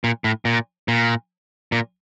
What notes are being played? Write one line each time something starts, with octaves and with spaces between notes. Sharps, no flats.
A#2
A2
A#2
A#2
A#2